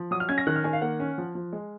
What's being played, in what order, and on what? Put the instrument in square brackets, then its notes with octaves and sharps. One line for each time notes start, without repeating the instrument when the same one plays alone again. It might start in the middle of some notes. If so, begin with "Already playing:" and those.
Already playing: [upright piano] F3
F#3 D#6
F6
C#4 G#6
A#6
D#3 F#6
F6
D#3 G#5
F5
A#3 F#5
C#4
F3
F3
G#3